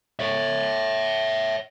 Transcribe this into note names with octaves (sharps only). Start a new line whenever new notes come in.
C#5 E5